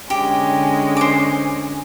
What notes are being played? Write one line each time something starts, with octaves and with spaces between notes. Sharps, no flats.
D3 G#3 C#4 G4
C5 D6